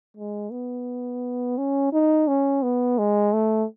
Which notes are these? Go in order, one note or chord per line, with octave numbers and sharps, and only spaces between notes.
G#3
B3
C#4
D#4
C#4
B3
G#3
A3